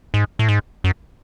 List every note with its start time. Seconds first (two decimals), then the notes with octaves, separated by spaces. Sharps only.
0.14 G#2
0.39 A2
0.49 G#2
0.84 F#2